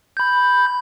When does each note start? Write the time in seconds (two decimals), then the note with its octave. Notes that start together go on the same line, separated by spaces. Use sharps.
0.17 B5 G6